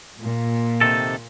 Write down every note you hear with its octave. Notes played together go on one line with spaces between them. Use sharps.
A#2
C3 D#3 A4